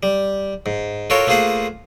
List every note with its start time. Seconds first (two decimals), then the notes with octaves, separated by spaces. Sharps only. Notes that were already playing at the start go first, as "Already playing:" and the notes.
0.03 G3
0.66 G#2
1.10 F4 F#4 A4 A#4 C#5 G5
1.27 A3 A#3 F4 G#4 C5 F#5